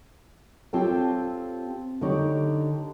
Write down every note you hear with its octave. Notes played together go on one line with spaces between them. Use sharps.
C4 F4 G4 A4 C#5 G5
D3 D#4 G4 C#5